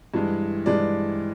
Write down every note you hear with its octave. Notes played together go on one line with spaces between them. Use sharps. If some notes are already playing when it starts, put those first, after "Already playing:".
G2 E3 G#3
G2 E3 G#3 D5